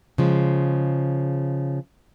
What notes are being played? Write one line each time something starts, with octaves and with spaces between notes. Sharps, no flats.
C#3 F3 G#3